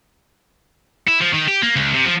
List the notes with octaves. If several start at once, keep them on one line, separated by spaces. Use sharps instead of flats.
E4
F3
D#3
G4
A#3
C#2
C3
F3